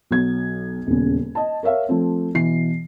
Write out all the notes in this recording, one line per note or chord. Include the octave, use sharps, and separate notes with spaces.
B1 F#3 G#6
D#1 E2 C#3
D#5 A5
A#4 C#5 E5 F5
F3 A3 C4
B2 E3 C7